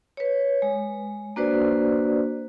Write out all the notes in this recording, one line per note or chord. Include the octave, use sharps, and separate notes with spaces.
B4 C#5
G#3
A#3 D4 F#4 B4 C5 D5